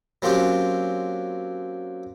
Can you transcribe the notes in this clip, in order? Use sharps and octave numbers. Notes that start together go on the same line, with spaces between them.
F#3 A#3 C4 C#4 F4 G4